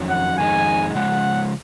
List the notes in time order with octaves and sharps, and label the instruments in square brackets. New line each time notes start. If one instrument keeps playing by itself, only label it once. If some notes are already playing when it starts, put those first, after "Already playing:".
Already playing: [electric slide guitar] F2 D#3 F#3 C#4
[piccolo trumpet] F#5
[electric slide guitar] F2 D#3 G#3 D#4 [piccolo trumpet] G#5
[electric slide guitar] C#3 F3 G#3 [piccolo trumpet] F#5